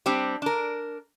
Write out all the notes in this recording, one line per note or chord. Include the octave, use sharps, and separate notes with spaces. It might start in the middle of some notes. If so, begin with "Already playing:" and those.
G3 C4 D4 G4
D4 A#4